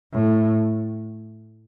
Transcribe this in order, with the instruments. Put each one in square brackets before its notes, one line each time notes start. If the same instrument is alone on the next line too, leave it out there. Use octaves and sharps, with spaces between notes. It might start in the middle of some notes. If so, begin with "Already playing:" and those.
[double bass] A2